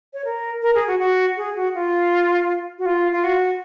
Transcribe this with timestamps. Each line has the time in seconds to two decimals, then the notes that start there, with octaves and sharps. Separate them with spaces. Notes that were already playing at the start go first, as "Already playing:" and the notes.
0.13 C#5
0.25 A#4
0.62 A#4
0.75 G#4
0.87 F#4
0.99 F#4
1.37 G#4
1.56 F#4
1.75 F4
2.79 F#4
2.86 F4
3.12 F4
3.24 F#4